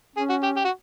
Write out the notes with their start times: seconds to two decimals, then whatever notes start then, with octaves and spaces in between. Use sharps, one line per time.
0.16 C#4 G#4
0.30 F#4
0.43 G4
0.57 G4
0.65 F#4